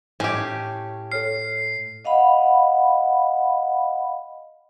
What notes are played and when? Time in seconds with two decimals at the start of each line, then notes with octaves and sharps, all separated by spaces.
0.20 A2 C#4 G4
1.12 A4 C#5 F6 C7
2.05 D#5 F5 F#5 B5